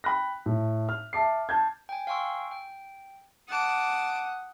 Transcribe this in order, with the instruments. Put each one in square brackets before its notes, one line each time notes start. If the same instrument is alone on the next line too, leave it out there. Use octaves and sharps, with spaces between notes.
[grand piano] G5 B5 F#6 A#6
A2
F6
E5 A5 D6 C7
A5 G6 G#6
[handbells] G5 G#5
F5 G5 G#5 C6 C#6 E6
G5
[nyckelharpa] F#5 D#6 [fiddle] A5 D6